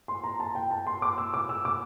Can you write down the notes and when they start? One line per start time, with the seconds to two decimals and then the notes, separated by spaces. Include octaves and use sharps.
0.08 C6
0.24 A#5
0.40 A5
0.55 G5
0.71 A5
0.87 C6
1.02 D6
1.18 E6
1.34 D6
1.49 E6
1.65 D6